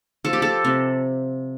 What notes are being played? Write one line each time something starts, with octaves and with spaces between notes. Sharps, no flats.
F3 A4
G4
A4
C3